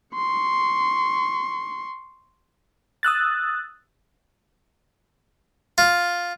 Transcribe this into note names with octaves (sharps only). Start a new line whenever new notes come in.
C6 C#6
D#6 E6 F#6 A6
F4